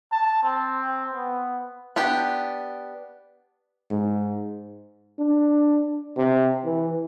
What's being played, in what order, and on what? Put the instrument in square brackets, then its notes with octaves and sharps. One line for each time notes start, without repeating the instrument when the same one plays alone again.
[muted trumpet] A5
C4
B3
[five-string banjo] B3 D4 G4
[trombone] G#2
[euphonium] D4
C3
E3